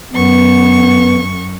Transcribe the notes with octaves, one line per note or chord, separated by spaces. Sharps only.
F#2 B3 C#6